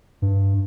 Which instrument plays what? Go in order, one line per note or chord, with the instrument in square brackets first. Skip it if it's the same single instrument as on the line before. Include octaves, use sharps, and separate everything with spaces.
[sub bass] G2